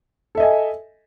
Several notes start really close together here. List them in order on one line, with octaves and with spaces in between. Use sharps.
A4 E5 D#5 G#5